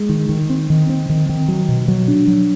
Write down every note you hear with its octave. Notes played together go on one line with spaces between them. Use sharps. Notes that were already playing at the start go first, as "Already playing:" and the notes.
Already playing: G#3
D#3
D#3
C4
D#3
C4
D#3
D#3
F#3
B2
F#3
D4
F#3